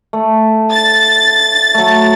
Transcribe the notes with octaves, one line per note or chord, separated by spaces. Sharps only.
A3
A6
F#3 A3